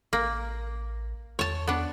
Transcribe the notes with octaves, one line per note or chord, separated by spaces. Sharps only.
A1 A#3
E2 C#5 A5
B3 D4